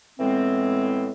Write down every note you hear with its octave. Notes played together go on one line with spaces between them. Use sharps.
A2 E3 G#3 B3 C4